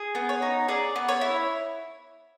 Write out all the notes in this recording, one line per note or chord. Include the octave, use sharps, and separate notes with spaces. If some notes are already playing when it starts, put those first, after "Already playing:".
Already playing: G#4
B3
C#5
D#4
G#4 D5
B3
C#5
E4